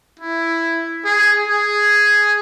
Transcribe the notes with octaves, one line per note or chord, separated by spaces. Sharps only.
E4
G#4
G#4